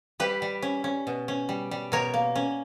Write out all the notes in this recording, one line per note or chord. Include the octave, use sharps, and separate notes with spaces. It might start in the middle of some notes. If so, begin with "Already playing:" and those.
G3 G4 B4
G3
C#4
C#4
B2
C#4
G3
G3
B2 A#4 C#5
A#3
C#4